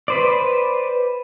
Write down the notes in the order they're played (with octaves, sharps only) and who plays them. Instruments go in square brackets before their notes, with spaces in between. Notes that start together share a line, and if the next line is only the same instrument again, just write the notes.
[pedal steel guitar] B4 C5 D5